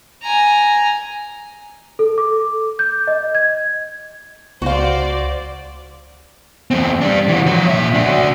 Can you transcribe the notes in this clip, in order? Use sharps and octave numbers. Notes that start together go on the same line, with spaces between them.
G#5 A#5
A4
D6
G6
D#5
G#6
C#2 F#4 C5 D5 F5
E2 C4
G3 D4
E3 F#4
F3 C#5
A#2 E5
D4 F#4